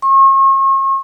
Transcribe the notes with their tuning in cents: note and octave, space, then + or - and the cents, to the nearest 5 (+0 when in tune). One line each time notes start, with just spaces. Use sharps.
C#6 -40